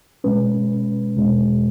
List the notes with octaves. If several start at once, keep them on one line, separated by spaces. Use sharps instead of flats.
B2 G#3 C#4 B4
E2 B2 G#3